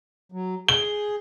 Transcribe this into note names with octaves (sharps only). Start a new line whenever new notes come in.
F#3
G#4 G7